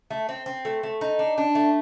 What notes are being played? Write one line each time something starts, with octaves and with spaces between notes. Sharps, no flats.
A3
C4
C4
A3
A3
D#4
D4
D4
A3